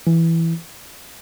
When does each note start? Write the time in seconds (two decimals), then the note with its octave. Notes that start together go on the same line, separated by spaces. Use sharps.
0.07 E3